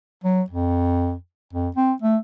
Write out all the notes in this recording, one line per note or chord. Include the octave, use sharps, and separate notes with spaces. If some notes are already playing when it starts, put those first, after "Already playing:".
F#3
F2
F2
C4
A3